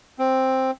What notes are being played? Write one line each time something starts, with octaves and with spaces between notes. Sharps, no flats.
C4